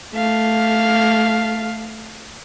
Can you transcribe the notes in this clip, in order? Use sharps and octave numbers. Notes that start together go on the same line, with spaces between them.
A3 F5